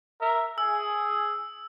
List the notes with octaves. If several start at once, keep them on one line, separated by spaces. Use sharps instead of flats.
A#4 E5
G#4 E6